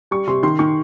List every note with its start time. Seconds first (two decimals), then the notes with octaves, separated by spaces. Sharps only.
0.11 G3 C#6
0.27 C3 C6
0.43 D#3 C6
0.59 D#3 C#6